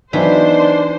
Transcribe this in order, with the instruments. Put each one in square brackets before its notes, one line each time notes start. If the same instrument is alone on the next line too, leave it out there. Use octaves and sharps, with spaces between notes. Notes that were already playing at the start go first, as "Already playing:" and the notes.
[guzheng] E3 [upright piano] F#3 B3 D#4 [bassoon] D4 [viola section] C5